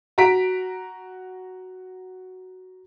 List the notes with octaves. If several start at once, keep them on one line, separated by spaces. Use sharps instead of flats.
F#4 A#5 B6 D7